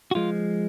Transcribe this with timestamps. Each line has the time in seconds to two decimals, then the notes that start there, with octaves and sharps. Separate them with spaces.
0.11 F#4
0.15 F3 G#3 F4